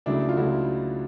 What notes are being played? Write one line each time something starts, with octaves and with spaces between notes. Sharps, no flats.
C#2 C#3 F#3 A3 D4 E4
F4
C#2 C#3 F#3 A3 E4 F#4